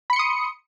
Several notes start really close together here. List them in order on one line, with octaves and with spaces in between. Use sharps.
B5 C#7 C6 D#6